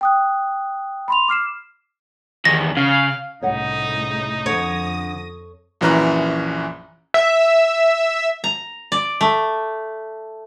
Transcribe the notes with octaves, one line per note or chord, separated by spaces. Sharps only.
G5 D#6 F#6
B5 C6 F7
D6 F6 C7 E7
E2 D#3 A#6
C#3 F5
C2 A2 C#3 D#4 C#5 F#5
F2 D3 C#5 D#6 A#6
A#1 F#2 E3 C#4 A#5 F#6
E5
A#5
D5
A3